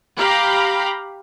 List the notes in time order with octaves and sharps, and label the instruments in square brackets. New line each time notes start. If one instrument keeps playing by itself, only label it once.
[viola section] G4 F5 A#5 B5